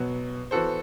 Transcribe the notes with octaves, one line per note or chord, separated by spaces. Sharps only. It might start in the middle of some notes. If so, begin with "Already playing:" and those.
Already playing: B2 F#3 B3 F#4
E3 B3 F#4 A4 C5